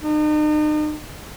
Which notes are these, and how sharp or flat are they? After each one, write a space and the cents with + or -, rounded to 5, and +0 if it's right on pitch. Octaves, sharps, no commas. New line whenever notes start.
D#4 -40